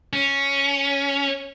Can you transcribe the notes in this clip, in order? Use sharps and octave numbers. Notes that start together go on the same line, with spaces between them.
C#4